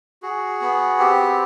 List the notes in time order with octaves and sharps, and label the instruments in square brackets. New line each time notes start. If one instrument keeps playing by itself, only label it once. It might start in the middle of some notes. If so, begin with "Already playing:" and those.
[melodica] F#4 G#4
B3
C4 G4